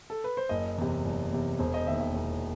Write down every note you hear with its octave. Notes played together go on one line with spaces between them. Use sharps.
A4
B4
C5
F#1 D#5
E2 C3
F#1
E2 C3
E1 C5
D#5
D#2 D#3 E5
E5
E1